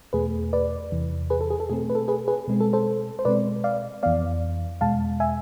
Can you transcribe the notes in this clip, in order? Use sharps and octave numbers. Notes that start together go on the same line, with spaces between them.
E2 B2 A3 G#4 B4
B4 D5
E2 C3 E3
G#4 B4
A4
G#4
A4
B2 A3 C4 G#4
B4
A4
G#4 B4
G#4 B4
B2 G#3 C4
A4
A4 C5
C5
B2 G#3 C4 B4 D5
D5 F5
F2 E3 B3 D5 F5
E2 B2 G#3 F5 A5
E5 G#5